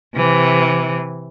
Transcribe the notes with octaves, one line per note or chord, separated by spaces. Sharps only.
C3 E3